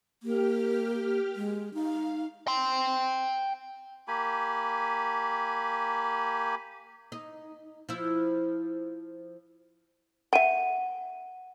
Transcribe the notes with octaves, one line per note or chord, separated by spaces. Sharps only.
A#3 G4 F6
G#3
D#4 F5
G5 C6
A#3 G4 G#5 B5
D#4
F3 E4
E5 F#5 G5 D#7